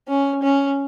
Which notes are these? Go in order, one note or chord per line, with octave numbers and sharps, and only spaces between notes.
C#4
C#4